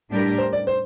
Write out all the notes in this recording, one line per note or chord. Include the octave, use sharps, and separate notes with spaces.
A2 G3 D4 G4 A#4
C5
D5
C5